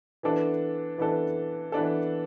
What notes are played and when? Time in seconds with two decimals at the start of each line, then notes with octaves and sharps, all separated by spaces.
0.23 E3 B3 D4 A4
0.98 E3 B3 D4 A4
1.72 E3 B3 D4 A4